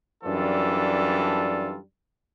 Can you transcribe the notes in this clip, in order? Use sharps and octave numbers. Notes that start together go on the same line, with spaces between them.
F#2 E3 G3 D4 F4 A4